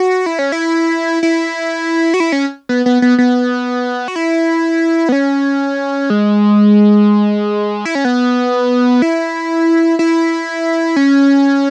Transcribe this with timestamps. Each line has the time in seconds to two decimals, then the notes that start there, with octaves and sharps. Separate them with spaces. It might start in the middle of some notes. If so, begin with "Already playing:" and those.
Already playing: F#4
0.26 E4
0.39 C#4
0.52 E4
1.23 E4
2.14 F#4
2.20 E4
2.32 C#4
2.69 B3
2.86 B3
3.02 B3
3.18 B3
4.08 F#4
4.16 E4
5.09 B3
5.12 C#4
6.10 G#3
7.85 E4
7.95 C#4
8.05 B3
9.02 E4
9.99 E4
10.96 C#4